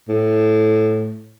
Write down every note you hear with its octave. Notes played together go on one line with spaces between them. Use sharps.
A2